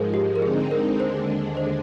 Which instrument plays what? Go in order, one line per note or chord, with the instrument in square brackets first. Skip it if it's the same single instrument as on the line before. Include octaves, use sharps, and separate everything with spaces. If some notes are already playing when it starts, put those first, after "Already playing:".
Already playing: [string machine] G#2 F3 G#3 [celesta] G#4 A#4 C5
[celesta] G4
A#4
[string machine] D3 G#3 C4 D#4 [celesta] G#4
[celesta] A#4
[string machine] D#2 D3 G#3 D4 [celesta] C5
[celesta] C5